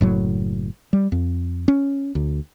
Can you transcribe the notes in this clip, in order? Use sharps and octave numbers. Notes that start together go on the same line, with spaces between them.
F#1 A2 F#3
G3
F2
C#4
D2